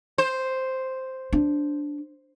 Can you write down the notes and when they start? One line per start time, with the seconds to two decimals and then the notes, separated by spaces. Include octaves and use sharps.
0.18 C5
1.33 D4